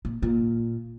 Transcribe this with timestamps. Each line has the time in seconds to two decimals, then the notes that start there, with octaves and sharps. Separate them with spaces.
0.05 A#2
0.22 A#2